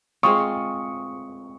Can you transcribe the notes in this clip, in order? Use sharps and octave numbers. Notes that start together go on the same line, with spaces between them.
G#3 C4 F4 C#6 D#6